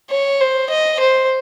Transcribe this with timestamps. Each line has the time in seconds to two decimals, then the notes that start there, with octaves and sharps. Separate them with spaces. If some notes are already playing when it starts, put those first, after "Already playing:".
0.10 C#5
0.41 C5
0.70 D#5
1.00 C5